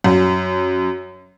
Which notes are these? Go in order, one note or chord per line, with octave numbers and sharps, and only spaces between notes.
F#2